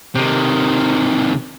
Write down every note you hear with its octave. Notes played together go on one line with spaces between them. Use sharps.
C3 D#3